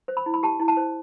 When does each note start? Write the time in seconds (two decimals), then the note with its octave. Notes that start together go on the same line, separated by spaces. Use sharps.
0.08 C5
0.17 B5
0.26 E4
0.34 B5
0.43 G4 A5
0.60 E4
0.68 A5
0.77 C5